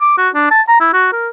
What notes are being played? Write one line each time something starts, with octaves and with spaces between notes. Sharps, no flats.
D6
F#4
D4
A5
A#5
E4
F#4
A#4